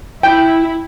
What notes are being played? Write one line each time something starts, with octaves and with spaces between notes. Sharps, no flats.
E4 G5